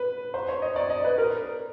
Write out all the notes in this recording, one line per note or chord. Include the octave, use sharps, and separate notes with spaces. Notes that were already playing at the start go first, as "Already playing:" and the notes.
Already playing: B4
C5
C#5
D#5
D5
D#5
B4
A#4